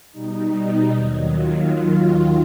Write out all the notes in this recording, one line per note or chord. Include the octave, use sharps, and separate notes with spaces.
B2 G3 D#4
D#2 D#3 F#3
F4